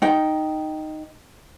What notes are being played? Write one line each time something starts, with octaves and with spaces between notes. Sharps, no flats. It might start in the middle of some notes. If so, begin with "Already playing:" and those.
D#4 G5